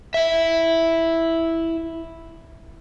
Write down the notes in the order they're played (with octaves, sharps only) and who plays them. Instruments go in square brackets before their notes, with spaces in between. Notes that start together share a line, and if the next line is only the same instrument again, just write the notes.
[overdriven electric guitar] E4 E5